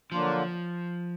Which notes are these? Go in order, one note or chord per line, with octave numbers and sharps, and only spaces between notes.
D3 F3 F#3 A#3 D4 F4